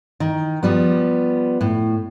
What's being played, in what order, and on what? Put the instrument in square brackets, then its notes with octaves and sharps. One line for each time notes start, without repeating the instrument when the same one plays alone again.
[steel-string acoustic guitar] D#3
F3 G3 B3
A2